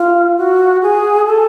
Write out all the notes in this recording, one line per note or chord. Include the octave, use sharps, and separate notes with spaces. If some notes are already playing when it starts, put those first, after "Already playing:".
Already playing: F4
F#4
G#4
A4